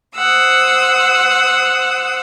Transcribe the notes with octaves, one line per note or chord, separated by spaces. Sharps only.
C5 F#5 D#6 E6